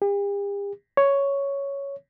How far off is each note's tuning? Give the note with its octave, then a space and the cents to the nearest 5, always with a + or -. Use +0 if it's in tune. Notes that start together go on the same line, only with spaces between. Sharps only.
G4 +45
C#5 +5